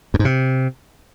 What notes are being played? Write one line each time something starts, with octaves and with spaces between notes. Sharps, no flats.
F#2
G#2
C3